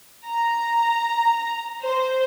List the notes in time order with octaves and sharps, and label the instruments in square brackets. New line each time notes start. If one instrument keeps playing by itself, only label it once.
[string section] A#5
C5